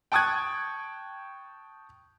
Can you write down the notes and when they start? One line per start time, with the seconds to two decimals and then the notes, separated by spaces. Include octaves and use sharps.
0.12 G5 A5 C#6 D#6 F#6 G#6